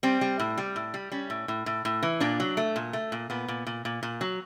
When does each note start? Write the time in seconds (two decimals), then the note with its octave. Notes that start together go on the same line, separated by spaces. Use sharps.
0.03 G3 C4
0.21 G3
0.40 A2
0.58 G3
0.76 A2
0.94 G3
1.11 G3 C#4
1.30 A2
1.48 A2
1.66 A2
1.85 A2
2.03 E3
2.20 A#2 D4
2.40 F#3
2.57 A3
2.76 A#2
2.93 A3
3.12 A#2
3.30 A#2 B3
3.48 A#2
3.67 A#2
3.85 A#2
4.03 A#2
4.21 F#3